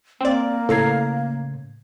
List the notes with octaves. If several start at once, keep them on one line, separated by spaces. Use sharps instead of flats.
A#3 C4 D5
A2 C#3 A4 A#5 G#6 C7